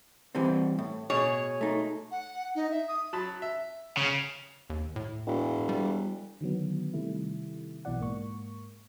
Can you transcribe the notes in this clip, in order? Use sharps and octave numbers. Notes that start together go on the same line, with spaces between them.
E3 G3 C4
A2
B2 G#4 C#5
A3 D#4
F#5
D#4
E5
D#6
F#3 A5 B5
E5
C#3
D#2
A2
E1
G3
D3 D#3 F#3 B3
C3 D#3 G3 A3 E4
B1 B2 E3 D5 F#5
G#2 A#3 C#6